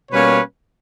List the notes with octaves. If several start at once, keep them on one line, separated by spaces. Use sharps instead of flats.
B2 G3 A#3 C#4 B4 C#5